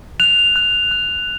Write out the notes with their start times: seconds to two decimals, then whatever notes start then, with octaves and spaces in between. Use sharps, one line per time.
0.20 F#6 F7
0.56 F#6
0.91 F#6